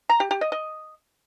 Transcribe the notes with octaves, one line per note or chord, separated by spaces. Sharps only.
A#5
G4
G4
D#5
D#5